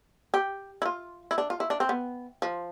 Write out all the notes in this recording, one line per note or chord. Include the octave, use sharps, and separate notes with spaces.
G4
E4
F4
E4
D4
F4
E4
D4
C4
B3
F3